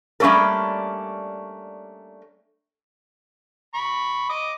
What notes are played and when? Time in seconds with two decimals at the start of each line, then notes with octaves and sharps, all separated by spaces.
0.20 G3 A3 A#3 C#4 D4 A4
3.74 B5 C#6
4.30 D#5 D6 D#6